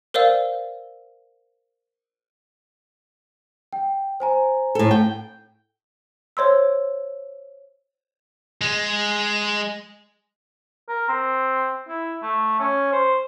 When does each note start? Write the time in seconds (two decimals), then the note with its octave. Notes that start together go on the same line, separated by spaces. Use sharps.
0.14 A#4 C5 D5 F5 E6
3.73 G5
4.20 C5 G#5 A#5
4.75 A2 A4
4.91 G5
6.37 C5 C#5 C6 E6
8.61 G#3
10.88 A#4
11.09 C4
11.88 E4
12.22 A3
12.60 C#4
12.92 C5